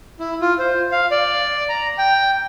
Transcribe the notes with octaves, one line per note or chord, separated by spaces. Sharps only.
E4
F4
C5
F5
D5
A#5
G5